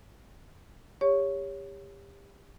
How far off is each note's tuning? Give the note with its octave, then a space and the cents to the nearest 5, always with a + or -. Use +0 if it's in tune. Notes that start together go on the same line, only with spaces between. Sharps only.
G4 +30 C#5 +5 C#6 +0